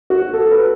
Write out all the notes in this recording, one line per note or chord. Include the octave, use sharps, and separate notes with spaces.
F#4
A4
B4